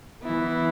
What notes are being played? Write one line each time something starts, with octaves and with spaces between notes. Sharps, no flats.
E3 B3 E4